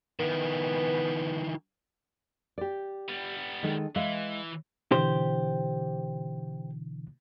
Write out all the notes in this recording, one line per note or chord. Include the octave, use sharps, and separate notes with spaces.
D#3 E3 B3
G4 D5
G3 B3
D#3 G#3 A4
E3 G#3 E5 F5
B2 D3 E3 G4 C5